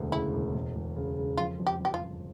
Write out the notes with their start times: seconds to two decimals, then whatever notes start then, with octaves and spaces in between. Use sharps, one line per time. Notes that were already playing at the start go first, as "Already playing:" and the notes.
Already playing: E1 D2
0.12 C#3 E4
0.33 E1
0.54 E1
0.75 E1
0.96 C#3
1.17 C#3
1.38 F2 F4
1.60 F2
1.67 G4
1.80 F2 G4
1.94 F4
2.01 G1